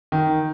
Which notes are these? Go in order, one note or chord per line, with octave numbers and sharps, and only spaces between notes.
D#3